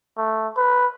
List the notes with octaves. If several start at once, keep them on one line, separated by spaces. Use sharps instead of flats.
A3
B4